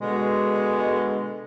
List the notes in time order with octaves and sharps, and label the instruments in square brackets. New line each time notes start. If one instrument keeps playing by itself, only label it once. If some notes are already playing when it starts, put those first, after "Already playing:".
[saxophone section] B2 D3 G#3